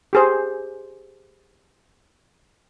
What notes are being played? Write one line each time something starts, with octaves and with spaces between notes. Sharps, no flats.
G4 G#4 C5